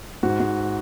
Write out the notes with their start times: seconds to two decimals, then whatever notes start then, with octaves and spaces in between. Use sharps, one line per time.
0.23 G#2 F#4
0.40 G#2